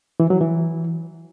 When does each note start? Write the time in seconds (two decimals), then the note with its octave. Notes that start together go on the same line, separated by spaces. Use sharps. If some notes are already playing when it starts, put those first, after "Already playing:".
0.20 E3
0.30 F#3
0.41 E3